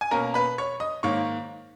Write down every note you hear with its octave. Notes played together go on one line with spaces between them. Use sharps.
G#5
B2 A#3 C#4 A#4 A#5
B4 B5
C#5 C#6
D#5 D#6
G#2 D#3 A#3 C#5 C#6